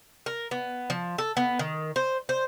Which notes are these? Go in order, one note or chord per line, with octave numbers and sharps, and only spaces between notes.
A#4
B3
F3
A4
B3
D#3
C5
C5